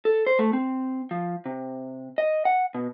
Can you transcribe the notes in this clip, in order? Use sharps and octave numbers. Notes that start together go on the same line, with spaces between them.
A4
C5
A3
C4
F3
C3
D#5
F#5
B2